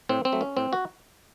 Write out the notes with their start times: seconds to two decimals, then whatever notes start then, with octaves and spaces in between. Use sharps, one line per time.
0.09 A2 C4
0.25 C4
0.32 F#3 A3
0.41 C#4
0.57 A2 C4
0.73 F#4